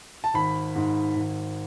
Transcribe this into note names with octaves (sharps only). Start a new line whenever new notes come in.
A5
G#1 B5
G#2
G#1